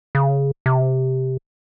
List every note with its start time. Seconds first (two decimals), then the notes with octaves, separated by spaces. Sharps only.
0.15 C#3
0.66 C3